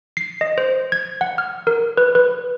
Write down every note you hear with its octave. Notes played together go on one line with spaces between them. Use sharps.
C7
D#5
C5
G#6
F#5
F6
A#4
B4
B4